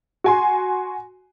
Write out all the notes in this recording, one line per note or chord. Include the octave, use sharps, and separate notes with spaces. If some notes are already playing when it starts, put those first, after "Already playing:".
F#4 G#5 C6